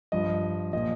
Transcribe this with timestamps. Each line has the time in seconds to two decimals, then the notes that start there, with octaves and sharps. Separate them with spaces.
0.12 G2 F3 D#5
0.73 A#2 F3 D#5